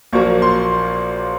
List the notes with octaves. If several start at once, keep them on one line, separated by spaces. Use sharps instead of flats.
A#1 A#2 F#3 A#3 C#6
C6